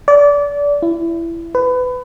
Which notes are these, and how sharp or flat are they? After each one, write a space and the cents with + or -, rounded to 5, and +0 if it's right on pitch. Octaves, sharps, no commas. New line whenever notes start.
D5 -25
E4 +20
B4 +25